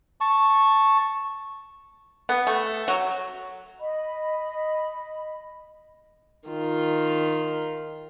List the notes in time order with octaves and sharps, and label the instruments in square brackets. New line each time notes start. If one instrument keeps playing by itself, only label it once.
[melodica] A5 C#6
[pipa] B3
A3
F#3
[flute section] D#5 B5
[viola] D#3 F4